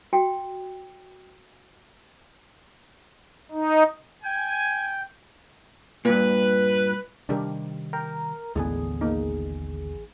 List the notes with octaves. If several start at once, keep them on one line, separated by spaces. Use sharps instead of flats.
F#4 G5
D#4
G5 G#5
G2 A#2 B4
C3 D#3 G3 D4 G4 A#4
A#4 G5
A1 D#2 D3 G#3 B3 G#4
A#3 D#4